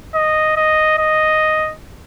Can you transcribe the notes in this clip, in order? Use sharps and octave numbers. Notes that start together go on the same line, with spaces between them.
D#5
D#5
D#5